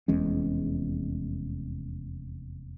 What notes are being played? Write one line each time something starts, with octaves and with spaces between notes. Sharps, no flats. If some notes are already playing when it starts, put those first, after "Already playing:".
F1 E2 G#3 C#4